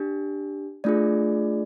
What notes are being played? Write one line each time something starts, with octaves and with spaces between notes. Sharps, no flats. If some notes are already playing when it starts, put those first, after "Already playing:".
Already playing: D4 G4
A3 D4 F4 G#4 D5